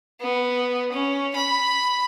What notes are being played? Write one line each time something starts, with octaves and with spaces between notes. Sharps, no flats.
B3
C#4
B5